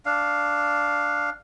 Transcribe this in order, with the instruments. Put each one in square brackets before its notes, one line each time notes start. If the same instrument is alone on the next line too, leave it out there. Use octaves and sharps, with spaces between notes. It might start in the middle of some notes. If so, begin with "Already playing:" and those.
[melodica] D4 F5